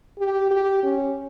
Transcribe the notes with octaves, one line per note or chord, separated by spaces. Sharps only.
G4
G4
C#4